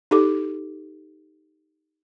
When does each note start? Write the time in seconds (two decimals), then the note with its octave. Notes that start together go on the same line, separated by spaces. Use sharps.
0.11 D#4 G4 A4 D6